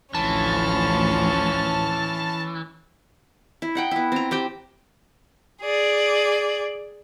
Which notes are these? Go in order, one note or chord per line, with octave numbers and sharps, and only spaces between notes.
A1 D2 E3 F3 C#4 A5 F6
E4
D#4 F#5 G5
B3 E4
C4 A#5
C4 G4 G5
G#4 D5